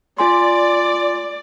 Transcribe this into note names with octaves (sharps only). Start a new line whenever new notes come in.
F4 D5 G#5 C6